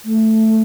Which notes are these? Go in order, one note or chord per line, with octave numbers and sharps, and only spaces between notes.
A3